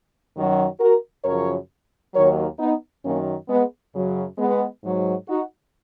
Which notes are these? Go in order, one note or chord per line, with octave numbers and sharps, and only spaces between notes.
F#2 D#3 F#3
F#4 A#4
F#2 C#3 F3 A#4 C#5
D#2 D#3 F#3 A#4 C#5
B3 D#4
F#2 D#3 F#3 A#3 C#4
G#3 B3
F#2 C#3 F#3
G#3 B3
G#2 F#3
D#4 F#4